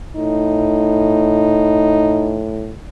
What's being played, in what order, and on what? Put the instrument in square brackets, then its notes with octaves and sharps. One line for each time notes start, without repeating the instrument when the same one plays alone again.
[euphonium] A2 [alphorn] D#4